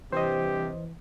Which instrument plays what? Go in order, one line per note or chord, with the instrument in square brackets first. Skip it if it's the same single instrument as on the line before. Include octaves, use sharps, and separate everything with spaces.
[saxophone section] G2 C3 [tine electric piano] E3 [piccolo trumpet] G4 [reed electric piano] C5 D#5